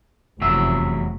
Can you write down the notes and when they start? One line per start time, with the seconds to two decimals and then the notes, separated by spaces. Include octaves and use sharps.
0.41 F1 E2 F#3 E5